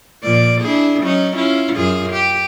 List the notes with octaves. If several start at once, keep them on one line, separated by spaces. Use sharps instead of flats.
A#2 F3 D5
D4 E4 G#4
F#3 C#4 D#4
C#4 E4 F4
F#2 F4 G#4
G4